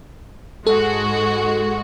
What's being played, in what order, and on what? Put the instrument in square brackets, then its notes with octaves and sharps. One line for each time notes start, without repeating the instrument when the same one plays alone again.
[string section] G#2 G#3 F#4 [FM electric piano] A4